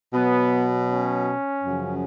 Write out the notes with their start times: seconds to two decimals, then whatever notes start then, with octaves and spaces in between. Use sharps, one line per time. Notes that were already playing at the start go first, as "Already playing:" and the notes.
0.13 B2 F#3 B3
0.89 C#4
1.64 F#2 C#3 F3